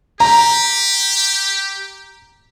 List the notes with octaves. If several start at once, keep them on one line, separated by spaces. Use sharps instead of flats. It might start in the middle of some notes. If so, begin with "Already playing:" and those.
G4 A#5